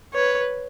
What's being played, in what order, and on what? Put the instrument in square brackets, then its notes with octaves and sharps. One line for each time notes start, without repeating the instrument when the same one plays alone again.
[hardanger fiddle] B4 [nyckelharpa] C#5